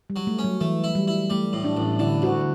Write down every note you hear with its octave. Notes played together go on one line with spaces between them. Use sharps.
G3
F#3
A3
C#4
F#3
E3 A3
E4
G3
E4
G3 A3
A2
D4
A1
D3 E4
D2 F#4